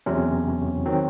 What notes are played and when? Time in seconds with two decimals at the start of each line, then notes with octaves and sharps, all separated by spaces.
0.06 E2 C3 F#3 C#4
0.85 D#3 F#3 C4